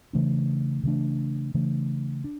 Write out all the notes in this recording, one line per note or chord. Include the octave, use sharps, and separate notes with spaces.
C#3 E3 A3 D4
C#3 E3 A3 D4
C#3 E3 A3 D4
D4